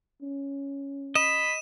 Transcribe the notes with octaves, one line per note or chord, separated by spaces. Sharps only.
C#4
D#5 B5 E7